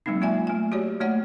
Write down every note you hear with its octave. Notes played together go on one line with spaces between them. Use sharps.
F#3 G#3 A#3 C4 D#4
A#3 F4 D5 E5 G#5
A3 G#5
F#4 G4 C#5 D5
A3 A#3 C#5 D5 F#5